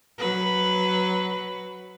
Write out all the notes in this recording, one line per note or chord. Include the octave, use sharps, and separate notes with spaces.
F#3 B4